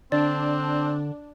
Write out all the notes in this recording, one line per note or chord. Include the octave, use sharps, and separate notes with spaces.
D3 C4 D4 D5